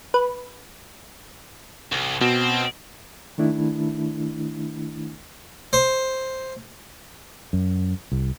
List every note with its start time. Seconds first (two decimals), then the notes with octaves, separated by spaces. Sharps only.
0.14 B4
1.92 C2
2.21 B2 C4
3.38 D#3 A3 D4 E4
5.73 C5
7.53 F#2
8.12 C2